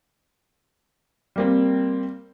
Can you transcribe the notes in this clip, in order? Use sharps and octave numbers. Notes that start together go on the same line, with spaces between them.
G3 A#3 C4